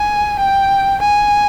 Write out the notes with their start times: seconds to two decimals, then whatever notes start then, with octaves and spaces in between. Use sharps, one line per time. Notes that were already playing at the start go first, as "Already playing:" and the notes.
Already playing: G#5
0.39 G5
1.01 G#5